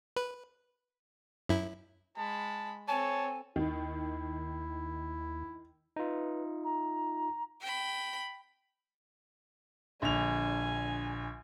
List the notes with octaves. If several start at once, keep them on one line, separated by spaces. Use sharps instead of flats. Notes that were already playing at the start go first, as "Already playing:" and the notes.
B4
F#2 E4
G#3 A5 B5
C4 A4 C#5 G#5 A5
D#2 D#3 E4
D#4 F4 B4
A#5
G5 B5
A#1 D3 G#5 F7